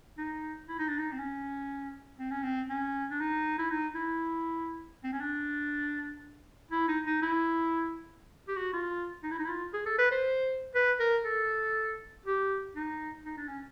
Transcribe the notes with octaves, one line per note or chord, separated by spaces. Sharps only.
D#4
E4
D#4
D4
D#4
C4
C#4
C4
C#4
C4
C#4
D4
D#4
E4
D#4
E4
C4
C#4
D4
E4
D#4
D#4
E4
G4
F#4
F4
D#4
E4
D#4
E4
F4
G#4
A4
B4
C5
B4
A#4
A4
G4
D#4
D#4
D4
C#4